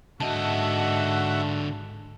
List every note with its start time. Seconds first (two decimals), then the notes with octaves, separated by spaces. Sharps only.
0.20 G#2 D3 F#4 D#5 E5 F#5 A5